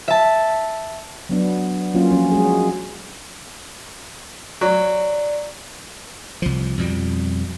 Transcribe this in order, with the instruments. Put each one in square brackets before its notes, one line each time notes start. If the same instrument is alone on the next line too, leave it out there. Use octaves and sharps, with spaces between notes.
[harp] E5 A5
[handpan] F#3 B3 D4
F#3 A#3 C#4 F4
F3 C#4
G#3 F#4 G#4
[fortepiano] F#3 [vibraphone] D5
[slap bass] C2 F3
F2 B2 G3